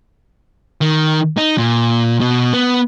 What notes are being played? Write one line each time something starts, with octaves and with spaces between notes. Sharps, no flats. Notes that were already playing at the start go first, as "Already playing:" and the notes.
D#3
D#4
A#2
B2
B3